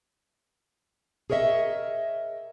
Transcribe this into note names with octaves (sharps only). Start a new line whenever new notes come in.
G#4 A#4 C#5 D#5 E5